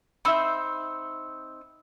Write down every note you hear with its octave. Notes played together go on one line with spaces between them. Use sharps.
C4 D#4 E5 B5 E6